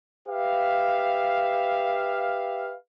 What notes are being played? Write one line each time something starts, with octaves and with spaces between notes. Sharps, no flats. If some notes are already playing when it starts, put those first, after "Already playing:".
G4 B4 E5 F5